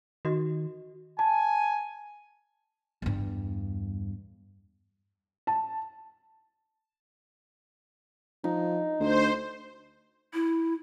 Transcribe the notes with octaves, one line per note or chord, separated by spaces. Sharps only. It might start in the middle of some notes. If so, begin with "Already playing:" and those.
D#3 F#4 D#5
G#5 A5
E2 G2
A5
F3 D#4
D2 C5
E4